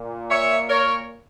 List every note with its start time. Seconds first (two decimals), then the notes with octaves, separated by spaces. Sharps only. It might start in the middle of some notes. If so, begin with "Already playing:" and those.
Already playing: A#2
0.30 C#5 E5
0.68 A#4 C#5